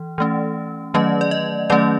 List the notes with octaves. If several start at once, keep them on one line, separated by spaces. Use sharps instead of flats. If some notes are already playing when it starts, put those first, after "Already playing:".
Already playing: E3
E3 A3 C#4
D#3 F#3 A3 C#4 D#5
D5
D#5
D#3 F#3 A3 C#4 D5